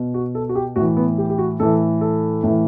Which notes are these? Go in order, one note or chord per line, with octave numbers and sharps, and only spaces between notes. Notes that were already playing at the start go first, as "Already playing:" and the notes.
Already playing: B2
F#4
A4
F#4
G4
A2 E3 F#4
B3
G4
G4
F#4
A2 E3 A4
A4
A2 E3